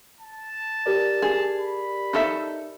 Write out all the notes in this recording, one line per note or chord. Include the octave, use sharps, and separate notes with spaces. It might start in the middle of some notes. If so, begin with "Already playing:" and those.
A5
G4 A#4 D5
G#4
B5
D#4 A4 E5